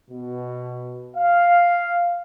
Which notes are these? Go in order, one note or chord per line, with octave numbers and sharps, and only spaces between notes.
B2
F5